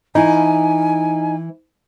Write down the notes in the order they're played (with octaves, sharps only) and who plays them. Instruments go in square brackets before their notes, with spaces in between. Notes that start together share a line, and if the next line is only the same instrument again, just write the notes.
[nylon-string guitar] E3 E4 [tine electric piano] D#4 [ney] G#5